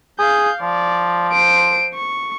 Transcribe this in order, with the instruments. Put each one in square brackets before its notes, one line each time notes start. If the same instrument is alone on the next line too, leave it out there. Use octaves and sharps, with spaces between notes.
[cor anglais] G#4 [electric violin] F5 G6
[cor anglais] F3 [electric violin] D5
[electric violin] C5 D7
C#6